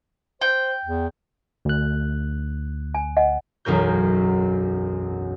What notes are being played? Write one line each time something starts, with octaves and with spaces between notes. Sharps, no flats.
C5 G5
E2
D2 F#6
G#5
D#5 F#5 G#5
E1 B1 F#2 C#4 A#4 G6